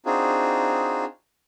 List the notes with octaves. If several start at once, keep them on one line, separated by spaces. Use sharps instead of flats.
C4 D4 D#4 F4 F#4 G#4